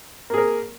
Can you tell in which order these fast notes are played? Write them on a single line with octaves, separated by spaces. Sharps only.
A#3 G#4 A#4